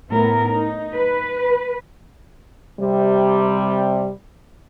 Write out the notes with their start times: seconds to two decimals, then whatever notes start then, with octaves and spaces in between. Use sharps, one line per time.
0.11 A2 B3 E4 A#4
0.49 D#4
0.94 B4
2.80 C3 G3